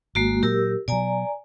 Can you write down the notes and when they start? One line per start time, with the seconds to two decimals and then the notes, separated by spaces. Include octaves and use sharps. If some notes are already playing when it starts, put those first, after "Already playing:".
0.15 G#1 G#3 A#3 F#4
0.43 A#2 F#3 G4 A#4 E6
0.88 B2 F#3 D5 G#5 A#5